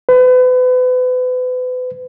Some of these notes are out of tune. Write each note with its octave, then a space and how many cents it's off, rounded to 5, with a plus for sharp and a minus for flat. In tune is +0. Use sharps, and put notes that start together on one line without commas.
B4 +35